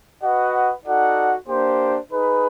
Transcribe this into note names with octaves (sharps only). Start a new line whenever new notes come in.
F#4 B4 D#5 F#5
D#4 F#4 A4 D5 F#5
A#3 D4 G4 C5
D#4 G#4 B4